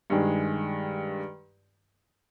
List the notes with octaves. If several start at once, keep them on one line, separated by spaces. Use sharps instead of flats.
G2 D#3 G#3